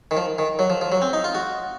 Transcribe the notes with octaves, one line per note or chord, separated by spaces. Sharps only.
D#3
F3
D#3
F#3
F3
F3
F#3
C4
D#4
F4
F#4